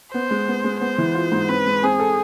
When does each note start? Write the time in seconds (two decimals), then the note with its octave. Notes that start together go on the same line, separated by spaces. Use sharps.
0.14 B3 C5
0.31 G#3
0.48 B3
0.64 G#3
0.81 B3 C5
0.98 E3
1.15 F4
1.32 G#2
1.49 C4 B4
1.66 G#3
1.83 C4 G#4
1.99 A4